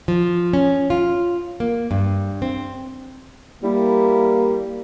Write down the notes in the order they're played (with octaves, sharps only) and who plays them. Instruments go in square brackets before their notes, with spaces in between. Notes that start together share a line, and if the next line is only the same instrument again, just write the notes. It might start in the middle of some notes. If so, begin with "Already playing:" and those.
[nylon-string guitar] F3
C#4
F4
A#3
G2
C4
[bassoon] G3 [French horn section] A#3 [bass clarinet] E4